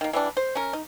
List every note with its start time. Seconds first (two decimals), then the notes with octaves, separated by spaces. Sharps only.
0.01 D#3 A#3
0.13 E3 G3 D4
0.37 C5
0.55 C#4 A#4
0.73 D#4